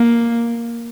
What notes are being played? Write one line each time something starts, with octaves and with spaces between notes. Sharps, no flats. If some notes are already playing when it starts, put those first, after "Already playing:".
Already playing: A#3